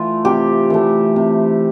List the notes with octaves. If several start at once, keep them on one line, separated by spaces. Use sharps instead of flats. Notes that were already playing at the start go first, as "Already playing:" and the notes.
Already playing: E3 A3 F4
C3 G4
E3 A3
C3